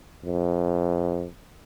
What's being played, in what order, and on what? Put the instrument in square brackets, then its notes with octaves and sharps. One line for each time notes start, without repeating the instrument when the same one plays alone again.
[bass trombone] F2